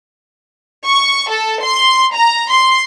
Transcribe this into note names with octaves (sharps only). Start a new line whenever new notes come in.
C#6
A4
C6
A#5
C6